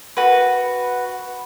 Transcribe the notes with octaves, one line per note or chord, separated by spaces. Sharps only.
F#4 B4